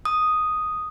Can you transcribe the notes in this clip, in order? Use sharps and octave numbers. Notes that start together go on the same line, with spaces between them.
D#6